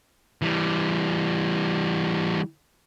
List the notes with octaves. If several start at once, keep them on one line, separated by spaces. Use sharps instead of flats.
E3 G3